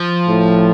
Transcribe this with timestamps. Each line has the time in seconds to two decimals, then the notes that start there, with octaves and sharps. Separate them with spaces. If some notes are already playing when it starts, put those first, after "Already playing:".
Already playing: F3
0.28 A2